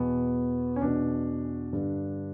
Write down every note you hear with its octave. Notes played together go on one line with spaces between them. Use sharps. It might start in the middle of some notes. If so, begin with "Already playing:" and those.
Already playing: E2 B2 B3
C#4
E2 B2 D4
G2 D3